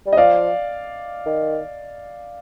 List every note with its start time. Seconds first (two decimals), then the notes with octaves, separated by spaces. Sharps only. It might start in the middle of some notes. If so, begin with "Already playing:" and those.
0.06 G3
0.13 D#5
0.17 F3 D5 F5
1.26 D#3